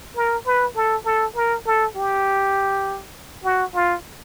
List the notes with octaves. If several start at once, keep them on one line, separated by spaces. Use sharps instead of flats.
A#4
B4
A4
A4
A#4
A4
G4
F#4
F4